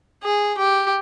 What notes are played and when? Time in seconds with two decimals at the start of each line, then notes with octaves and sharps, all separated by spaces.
0.23 G#4
0.58 G4